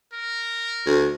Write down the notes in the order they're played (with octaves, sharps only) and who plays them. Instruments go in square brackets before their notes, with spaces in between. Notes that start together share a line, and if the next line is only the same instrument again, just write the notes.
[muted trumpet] A#4
[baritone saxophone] D2